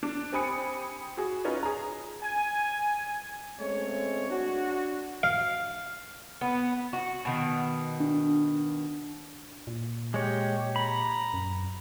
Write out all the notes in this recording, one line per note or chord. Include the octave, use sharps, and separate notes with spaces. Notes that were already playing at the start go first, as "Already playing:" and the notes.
D4
C4 G4 G#5 B5 D#6 C#7
F#4 G#4
C#4 D#4 F4 B4 C#5
G#4 A#5
G#5
G#3 A3 C4 C#4 C#5
D4 F#4
F5
B3
F#4
B2 D#3
D4
A#2
G#3 G4 C#5 G5
A#5 B5
F#2